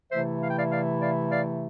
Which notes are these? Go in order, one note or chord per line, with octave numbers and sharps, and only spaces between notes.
C3 E3 A3 E4 C5 E5
F5
G5
D5 F5
D5 F5
D5 F5
D5 F5